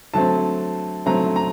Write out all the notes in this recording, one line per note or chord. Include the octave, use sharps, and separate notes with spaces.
D3 F#3 A3 C4 A5
D3 F#3 A3 C4 A#5
A#5